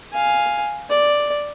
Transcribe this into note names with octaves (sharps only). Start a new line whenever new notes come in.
F5 G#5
D5